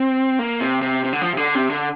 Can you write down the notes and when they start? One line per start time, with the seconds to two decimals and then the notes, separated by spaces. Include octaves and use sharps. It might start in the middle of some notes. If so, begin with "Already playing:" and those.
Already playing: C4
0.39 A#3
0.61 C3
0.82 C3
1.04 C3
1.13 D3
1.21 F3
1.33 C3
1.37 D3
1.55 C3
1.70 D3